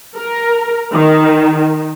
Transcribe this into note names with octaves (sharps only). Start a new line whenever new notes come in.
A#4
D#3